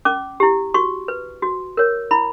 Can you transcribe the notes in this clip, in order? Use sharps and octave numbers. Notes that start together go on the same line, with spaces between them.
C#4 D6
E4 G4
F#4 C#6
B4
F#4
A#4 C#5
E4 B5